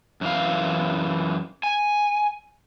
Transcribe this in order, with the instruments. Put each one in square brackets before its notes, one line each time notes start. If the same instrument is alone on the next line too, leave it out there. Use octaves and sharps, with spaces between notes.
[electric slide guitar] F#2 E3 F5
G#5